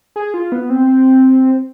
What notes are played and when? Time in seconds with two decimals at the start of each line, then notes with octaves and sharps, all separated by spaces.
0.16 G#4
0.34 F4
0.52 B3
0.70 C4